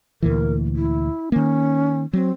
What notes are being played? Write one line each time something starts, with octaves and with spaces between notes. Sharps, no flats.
D2 A#2 E3 A#4
E4
D#3 A#3 C#4
F#3 C4